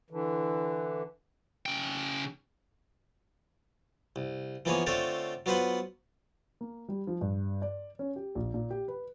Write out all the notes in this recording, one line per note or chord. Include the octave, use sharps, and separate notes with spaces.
D3 E3
C#3 G5
C2
E3 F3 A#3 B3 G#4 C#5
D3 A3 C4 F4 A4 C#5
F#3 B3 F4 B4 C5 F#5
A#3
G3
F3
G2
D5
C#4
G4
A#1
A#2
G4
B4